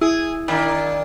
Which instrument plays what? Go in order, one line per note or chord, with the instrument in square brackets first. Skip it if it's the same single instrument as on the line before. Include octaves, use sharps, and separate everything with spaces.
[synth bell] E4 [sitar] G#4
[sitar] D#3 A#3 D4